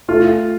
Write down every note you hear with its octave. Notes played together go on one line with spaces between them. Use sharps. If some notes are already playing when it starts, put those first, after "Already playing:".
A3 F4